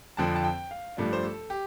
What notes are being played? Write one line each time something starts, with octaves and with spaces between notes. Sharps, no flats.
F2 D3 F3 C4 A5
A5
G5
F5
G2 F3 A3 D4
C5
A4
G4